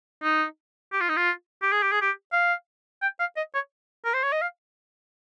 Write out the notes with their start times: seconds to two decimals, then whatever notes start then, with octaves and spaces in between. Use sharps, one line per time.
0.23 D#4
0.92 G4
1.01 F4
1.09 D#4
1.17 F4
1.62 G4
1.72 G#4
1.83 G4
1.92 G#4
2.01 G4
2.33 F5
3.02 G5
3.20 F5
3.37 D#5
3.55 C#5
4.05 A#4
4.14 C5
4.23 C#5
4.33 D#5
4.42 F5